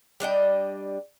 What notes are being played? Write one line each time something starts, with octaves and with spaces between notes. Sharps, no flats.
G3 D4 D#5 G5